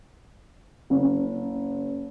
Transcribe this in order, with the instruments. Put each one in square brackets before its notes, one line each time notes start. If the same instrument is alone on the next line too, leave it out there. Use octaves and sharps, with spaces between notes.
[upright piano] F#1